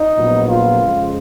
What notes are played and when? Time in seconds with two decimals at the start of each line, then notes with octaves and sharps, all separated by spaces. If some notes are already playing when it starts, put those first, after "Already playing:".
Already playing: D#4
0.17 A#1 A#2 F#3 B3
0.48 F4
0.80 F2 C#3 G#3